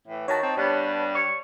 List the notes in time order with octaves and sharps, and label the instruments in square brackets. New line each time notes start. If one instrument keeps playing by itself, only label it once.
[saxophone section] A2 E3
[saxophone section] D#3 F#4 [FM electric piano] C#5 A5
[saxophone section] C4 D#4
[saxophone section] G2 G3 [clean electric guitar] B3
[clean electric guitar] C#5